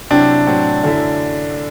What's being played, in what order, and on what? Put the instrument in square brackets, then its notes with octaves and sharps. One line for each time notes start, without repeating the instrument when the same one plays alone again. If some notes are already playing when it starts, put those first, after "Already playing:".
[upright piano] C3 F#3 C4 E4 G4 [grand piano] D4
[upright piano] A2 F#3 C4
F#2 D3 A3 E4